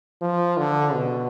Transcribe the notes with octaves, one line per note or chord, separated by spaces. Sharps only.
F3
D3
B2